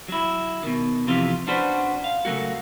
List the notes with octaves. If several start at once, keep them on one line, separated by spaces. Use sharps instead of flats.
F#3 E4
B2 D#3
F2 C3 E3 F4
C#4 D4 F#4 B4 C5
F5
C#3 F#3 A3 A#3 F#4